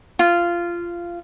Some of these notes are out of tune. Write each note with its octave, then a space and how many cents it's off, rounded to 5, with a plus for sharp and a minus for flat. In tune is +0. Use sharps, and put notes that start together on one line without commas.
F4 -15